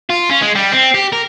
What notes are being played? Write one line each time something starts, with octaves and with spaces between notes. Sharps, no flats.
F4
C#4
G#3
G3
C4
G4
A#4